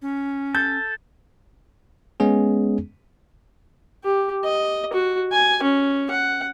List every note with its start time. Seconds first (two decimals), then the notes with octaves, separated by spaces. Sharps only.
0.02 C#4
0.55 A4 G6
2.20 G#3 B3 C#4 G#4
4.04 G4
4.45 D#5
4.93 F#4
5.32 G#5
5.63 C#4
6.10 F#5